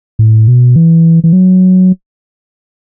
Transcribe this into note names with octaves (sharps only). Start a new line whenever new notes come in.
A2
B2
E3
E3
F#3